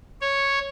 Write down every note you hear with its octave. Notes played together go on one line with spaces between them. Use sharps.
C#5